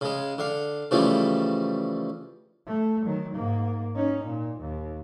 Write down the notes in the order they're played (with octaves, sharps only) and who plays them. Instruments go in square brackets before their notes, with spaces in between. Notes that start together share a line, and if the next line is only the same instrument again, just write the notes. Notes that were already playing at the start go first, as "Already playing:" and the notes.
[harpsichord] C#3 G#3
D3 F5
C#3 E3 F3 G3 A3
[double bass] A3
D#3 F#3
G#2 A#3
C#4 D#4
A#2
D#2